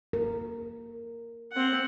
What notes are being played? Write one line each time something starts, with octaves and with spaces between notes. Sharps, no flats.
A#4
C4 F#5